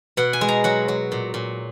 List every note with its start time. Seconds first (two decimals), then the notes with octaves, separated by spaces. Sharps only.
0.17 B2 F#5
0.33 G#5
0.41 G#3
0.49 A#5
0.64 F#3 F#5
0.88 F#3
1.12 A#2
1.34 A#2